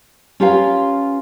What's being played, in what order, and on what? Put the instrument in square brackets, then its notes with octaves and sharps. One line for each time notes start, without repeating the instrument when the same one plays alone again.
[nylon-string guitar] C#4 F4 G4 A#4 B4 F5